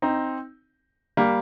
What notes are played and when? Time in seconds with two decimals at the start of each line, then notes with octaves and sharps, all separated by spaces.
0.02 C4 D#4
1.17 G3 A#3